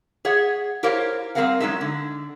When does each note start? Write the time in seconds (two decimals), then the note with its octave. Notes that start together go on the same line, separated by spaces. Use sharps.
0.25 G#4 C#5 E5 F#5
0.83 E4 G4 A#4 C5 C#5 F5
1.35 G3 G#3 C4 A#4 F5 F#5
1.60 F#3 G#3 C#4 D#4 A4 E5
1.81 D3